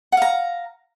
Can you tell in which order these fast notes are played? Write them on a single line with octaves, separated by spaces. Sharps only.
F#5 F5 A#5